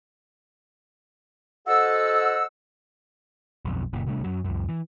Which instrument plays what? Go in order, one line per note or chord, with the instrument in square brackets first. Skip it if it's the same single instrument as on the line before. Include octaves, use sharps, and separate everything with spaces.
[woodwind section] F#4 A4 C5 D#5 F#5 E6
[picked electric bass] B1 F2
F#1 A#2
C3 G3 A3 D4
F#2 F#3
C#2 F#2
E3